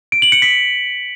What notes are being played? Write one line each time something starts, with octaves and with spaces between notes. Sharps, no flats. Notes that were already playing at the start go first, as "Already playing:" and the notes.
D7
F#7
C#7
B6